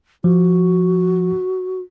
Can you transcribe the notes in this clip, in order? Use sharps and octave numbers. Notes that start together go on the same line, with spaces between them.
F3 F#4